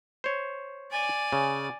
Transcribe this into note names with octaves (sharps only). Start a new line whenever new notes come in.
C5 C#5
D5 G#5
C#3